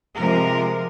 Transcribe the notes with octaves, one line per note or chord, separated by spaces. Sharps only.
C3 F3 G#3 A#4